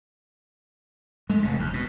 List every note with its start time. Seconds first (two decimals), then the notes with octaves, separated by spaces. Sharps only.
1.30 G#3 A3
1.43 F1 C#3
1.59 D#2
1.74 B2